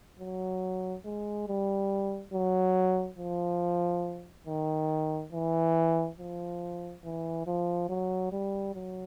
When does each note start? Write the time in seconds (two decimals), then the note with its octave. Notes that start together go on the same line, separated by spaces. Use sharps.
0.19 F#3
1.05 G#3
1.48 G3
2.33 F#3
3.18 F3
4.47 D#3
5.32 E3
6.18 F3
7.04 E3
7.47 F3
7.89 F#3
8.32 G3
8.74 F#3